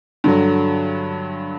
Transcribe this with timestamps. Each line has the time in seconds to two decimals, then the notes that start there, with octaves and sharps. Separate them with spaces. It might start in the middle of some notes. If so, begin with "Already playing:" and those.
0.24 G2 D3 F#3